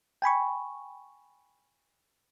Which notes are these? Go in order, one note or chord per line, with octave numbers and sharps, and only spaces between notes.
G5 G#5 B5 C#6